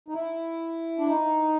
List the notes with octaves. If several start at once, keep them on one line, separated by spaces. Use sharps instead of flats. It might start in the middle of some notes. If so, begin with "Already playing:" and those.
D#4
E4
D4
D#4